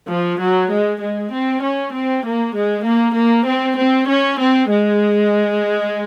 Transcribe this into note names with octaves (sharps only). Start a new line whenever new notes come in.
F3
F#3
G#3
G#3
C4
C#4
C4
A#3
G#3
A#3
A#3
C4
C4
C#4
C4
G#3